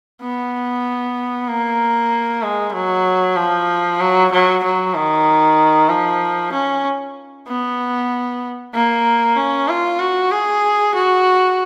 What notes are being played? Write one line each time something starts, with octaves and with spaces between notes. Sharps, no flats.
B3
A#3
G#3
F#3
F3
F#3
F#3
F#3
D#3
F3
C#4
B3
A#3
C#4
F4
F#4
G#4
F#4